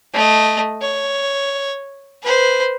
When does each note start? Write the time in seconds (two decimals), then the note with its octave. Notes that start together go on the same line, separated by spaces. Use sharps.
0.14 A3 D#5
0.81 C#5
2.23 B4 C5